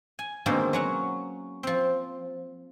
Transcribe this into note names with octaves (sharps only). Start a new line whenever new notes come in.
G#5
B2 D3 D#3 G#3 A#3 C4
F#3 C#4 F#5
F3 C4